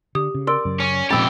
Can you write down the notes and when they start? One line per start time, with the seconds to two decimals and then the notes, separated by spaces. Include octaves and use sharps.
0.15 D3 G4 D#6
0.34 C#3
0.47 A#4 D5 C6 E6
0.65 F#2 C#3
0.80 C#4 D#7
1.10 F2 A#2 G#3 C#4 G4 B5 E6 A6